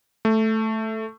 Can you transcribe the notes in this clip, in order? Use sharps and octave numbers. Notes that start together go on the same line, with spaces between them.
A3